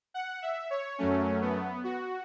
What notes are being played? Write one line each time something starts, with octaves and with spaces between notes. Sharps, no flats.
F#5
E5
C#5
F#2 F#3 A3 C#4
B3
F#4